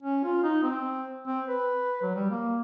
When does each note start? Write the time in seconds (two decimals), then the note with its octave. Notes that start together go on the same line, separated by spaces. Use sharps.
0.03 C#4
0.24 F4
0.43 D#4
0.63 C4
1.27 C4
1.48 B4
2.02 F#3
2.15 G3
2.30 A#3